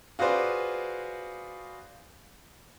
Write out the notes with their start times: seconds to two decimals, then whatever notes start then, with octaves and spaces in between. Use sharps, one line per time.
0.19 F4 F#4 G#4 B4 C5 D5